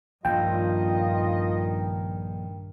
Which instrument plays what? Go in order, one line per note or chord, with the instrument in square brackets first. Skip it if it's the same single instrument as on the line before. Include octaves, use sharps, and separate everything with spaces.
[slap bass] A#1 [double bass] G2 D#3 [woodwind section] F4 D#5 [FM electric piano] G5